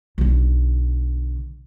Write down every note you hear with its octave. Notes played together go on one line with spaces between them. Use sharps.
B1 D3